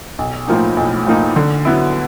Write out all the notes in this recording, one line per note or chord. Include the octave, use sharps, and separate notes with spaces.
B1
A2 F3 A#3 D#4
B1
A2 F3 A#3 D#4
D3
F#3 B3 E4